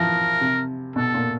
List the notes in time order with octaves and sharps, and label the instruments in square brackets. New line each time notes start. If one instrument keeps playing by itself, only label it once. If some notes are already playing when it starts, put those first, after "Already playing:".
Already playing: [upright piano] E3 F3 [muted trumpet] A#4
[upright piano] C3
[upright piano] B2 [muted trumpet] A4
[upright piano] A#2